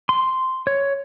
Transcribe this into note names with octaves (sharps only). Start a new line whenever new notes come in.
C6
C#5